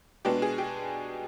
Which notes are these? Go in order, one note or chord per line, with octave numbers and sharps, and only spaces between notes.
B2 G#3 B3 D4 G4
G#4
G4